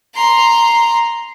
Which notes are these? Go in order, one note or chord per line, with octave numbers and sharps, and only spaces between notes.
A#5 C6